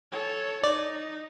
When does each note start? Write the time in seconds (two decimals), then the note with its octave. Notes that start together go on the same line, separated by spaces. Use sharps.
0.12 A4 C#5
0.63 D#4 D5